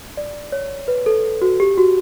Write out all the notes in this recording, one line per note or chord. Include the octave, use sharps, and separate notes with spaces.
D5
C#5
B4
A4
F#4
G4
F#4